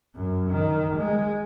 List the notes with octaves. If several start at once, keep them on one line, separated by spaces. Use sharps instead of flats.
F#2
D#3
G#3